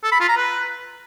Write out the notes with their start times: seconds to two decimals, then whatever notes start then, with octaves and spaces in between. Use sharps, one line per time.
0.04 A4
0.12 B5
0.20 F4
0.29 A#5
0.37 B4